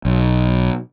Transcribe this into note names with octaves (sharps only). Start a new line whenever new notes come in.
B1